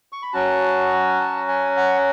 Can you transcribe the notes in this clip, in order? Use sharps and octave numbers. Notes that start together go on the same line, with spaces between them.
C#6
B5
F#3 C#4 F#4 A5
A5
G#5
F#5